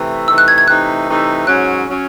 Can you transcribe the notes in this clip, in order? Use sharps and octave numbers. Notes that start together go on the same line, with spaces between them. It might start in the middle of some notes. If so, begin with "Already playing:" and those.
Already playing: C3 E3 A3
C3 E3 A3 D#4 E6
F#6
G#6
G#6
C3 E3 A3 D#4 F#6
C3 E3 A3 D#4
G#2 F#3 C#4 F#6
F#3 C#4